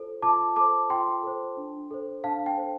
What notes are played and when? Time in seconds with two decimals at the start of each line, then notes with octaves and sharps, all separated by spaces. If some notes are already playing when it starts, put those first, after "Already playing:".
Already playing: F4 A4 C5
0.22 F4 A5 D6
0.56 A4 C5 A5 D6
0.90 F4 G5 C6
1.23 A4 C5
1.57 D4
1.91 A4 C5
2.24 D4 F5 A5
2.46 G5
2.57 A4 C5